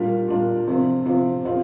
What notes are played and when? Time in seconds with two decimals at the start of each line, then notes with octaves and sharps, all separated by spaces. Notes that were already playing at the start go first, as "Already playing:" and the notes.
Already playing: A#2 G3 D4 F4 A#4
0.28 A#2 G3 D4 F4 A#4
0.68 C3 F3 C4 F4
1.06 C3 F3 C4 F4
1.45 F3 C4 F4 C5